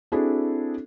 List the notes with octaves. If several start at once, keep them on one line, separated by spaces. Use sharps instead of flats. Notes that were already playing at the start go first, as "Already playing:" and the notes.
C4 D4 E4 F#4 G#4 A4